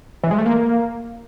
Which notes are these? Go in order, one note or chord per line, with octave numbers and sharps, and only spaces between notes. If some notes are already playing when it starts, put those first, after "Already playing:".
E3
G#3
A3
A#3